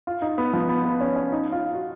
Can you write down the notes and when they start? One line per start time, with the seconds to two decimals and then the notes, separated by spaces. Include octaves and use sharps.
0.07 F4
0.22 D#4
0.38 B3
0.53 F3
0.69 B3
0.85 B3
1.01 C#4
1.16 C#4
1.32 D#4
1.52 F4
1.73 F#4